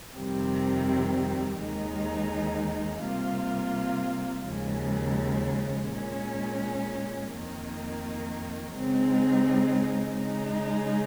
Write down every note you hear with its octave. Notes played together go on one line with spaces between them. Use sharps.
F2 C3 D#3 G3 C4
D#2 D#3 G#3 D#4
C3 G3 A#3 F4
D#2 C#3 F3 G#3
A#2 G#3 C#4
F2 D#3 A#3
C#3 G#3 C4 D#4
C#3 G#3 D#4